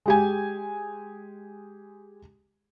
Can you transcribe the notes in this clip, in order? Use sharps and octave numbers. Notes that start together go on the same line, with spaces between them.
G#3 G4 G#5